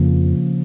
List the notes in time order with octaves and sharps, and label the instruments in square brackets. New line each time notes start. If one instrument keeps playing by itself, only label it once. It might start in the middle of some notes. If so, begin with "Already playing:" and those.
Already playing: [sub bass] F2 [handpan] C#3 F3 A#3